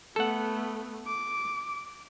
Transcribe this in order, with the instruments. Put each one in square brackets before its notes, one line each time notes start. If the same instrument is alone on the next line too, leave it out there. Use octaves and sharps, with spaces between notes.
[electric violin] A3 B3 [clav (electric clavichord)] A4 F#5
[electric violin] D6